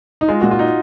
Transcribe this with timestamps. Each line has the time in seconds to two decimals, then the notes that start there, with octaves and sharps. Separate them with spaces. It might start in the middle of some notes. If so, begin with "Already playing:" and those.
0.21 D#4
0.28 G#3 F4
0.41 A#2 F#4
0.51 F4
0.59 D#4